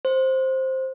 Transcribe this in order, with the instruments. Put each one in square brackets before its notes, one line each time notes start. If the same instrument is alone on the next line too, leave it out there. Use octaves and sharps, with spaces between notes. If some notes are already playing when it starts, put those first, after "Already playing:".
[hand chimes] C5